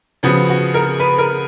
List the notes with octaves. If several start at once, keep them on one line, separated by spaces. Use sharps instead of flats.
C#3 F3 B3 F#4
F#4
A#4
B4
A#4